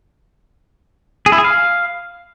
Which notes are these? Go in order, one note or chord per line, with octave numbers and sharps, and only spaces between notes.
G#4
E4
G#4
F5